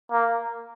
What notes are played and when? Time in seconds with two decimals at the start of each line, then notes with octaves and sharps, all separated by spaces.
0.12 A#3